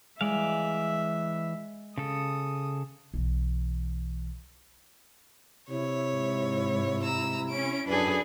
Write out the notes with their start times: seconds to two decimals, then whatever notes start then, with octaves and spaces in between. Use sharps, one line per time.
0.21 E3 G#3 D5 E5 F5
1.98 C#3 A4 D#6
3.14 B1 E3
5.70 C3 E4 C#5
6.12 G#2
7.03 A#5 E6
7.50 C#4 D7
7.88 F#2 D4 G#4 A4 B4